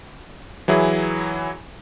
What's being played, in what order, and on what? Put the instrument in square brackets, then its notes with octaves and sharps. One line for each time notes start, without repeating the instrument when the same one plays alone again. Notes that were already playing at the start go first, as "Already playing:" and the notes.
[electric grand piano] E3 F#3 E4 G#4